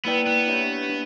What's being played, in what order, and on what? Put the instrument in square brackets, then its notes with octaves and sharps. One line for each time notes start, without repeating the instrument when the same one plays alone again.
[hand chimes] A#3 E4 B4 D5 G5 [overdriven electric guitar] B3
[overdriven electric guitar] B3
[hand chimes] D4 G4 C#5 E5
A#3 D4